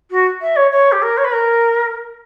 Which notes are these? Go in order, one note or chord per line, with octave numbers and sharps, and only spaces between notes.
F#4
E5
C#5
C#5
G4
A#4
C#5
B4
A#4